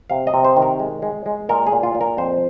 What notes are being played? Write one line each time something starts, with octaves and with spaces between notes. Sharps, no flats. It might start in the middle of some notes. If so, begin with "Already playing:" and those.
C3 F5
D#5
C3
C5
D#3
A#4
G#3
G#3
G#3
A#2 A#4
G#4
A#2
F4
A#2
A#4
F2 C5